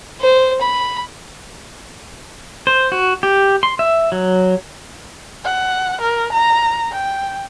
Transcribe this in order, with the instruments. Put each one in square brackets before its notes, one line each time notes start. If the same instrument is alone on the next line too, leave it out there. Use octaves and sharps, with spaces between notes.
[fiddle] C5
B5
[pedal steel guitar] C5
F#4
G4
C6
E5
F#3
[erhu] F#5
A#4
A#5
G5